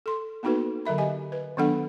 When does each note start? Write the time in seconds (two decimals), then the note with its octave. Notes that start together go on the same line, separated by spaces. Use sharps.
0.06 A4 C6
0.43 A#3 B3 D#4 F#4 A4 B4
0.85 D3 F#3 A#4 E5 B5
0.98 G4 D#5 G#5
1.32 B4
1.57 D#3 F#3 B3 D4 A4 F#5